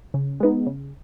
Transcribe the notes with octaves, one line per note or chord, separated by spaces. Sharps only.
C#3
G#3 B3 D#4
C#3